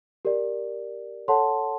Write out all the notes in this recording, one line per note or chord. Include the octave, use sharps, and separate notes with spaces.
G4 A#4 D5
A4 C#5 F#5 A5 C6